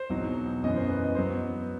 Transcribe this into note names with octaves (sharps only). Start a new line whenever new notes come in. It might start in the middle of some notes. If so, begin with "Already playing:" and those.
Already playing: C5
E2 B2 F#3 C4 D#4
F#2 E3 B3 D#5
C5
B4
D#5
F#3 B3 C5